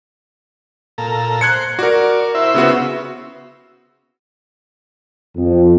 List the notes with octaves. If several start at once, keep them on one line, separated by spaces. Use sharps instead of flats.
A#2 A4 A#5
C5 F#6 G#6 C#7
F#4 A#4 D5
E4 C5 E5
C#3 B3 F#4
F2